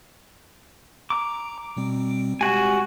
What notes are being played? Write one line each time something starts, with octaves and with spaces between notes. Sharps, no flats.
A#5 D6
B2 G3 C4
G#3 F#4 G4 G#5